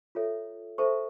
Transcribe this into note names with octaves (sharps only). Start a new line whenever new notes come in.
F4 A4 C#5 E5
A4 C5 E5 A5 C#6